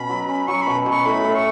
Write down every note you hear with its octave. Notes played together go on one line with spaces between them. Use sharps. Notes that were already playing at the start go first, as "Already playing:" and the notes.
Already playing: B2 C#4 B5
F#3
C#4
F#3 C#6
B2 B5
B2
C#6
A2 B5
A2
C#6